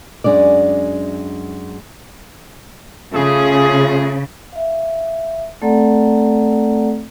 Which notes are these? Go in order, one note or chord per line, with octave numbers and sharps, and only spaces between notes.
F#2 G#3 D4 D5
C#3 A3 F4 G#4
E5 F5
A3 C4 A4 D5 F#5 A#5